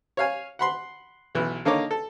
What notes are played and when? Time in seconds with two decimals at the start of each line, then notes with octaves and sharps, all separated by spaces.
0.17 C#5 F5 G#5
0.59 F#5 B5 C6
1.35 B1 E3
1.65 D3 A#3 D#4 C#5 D6
1.91 A4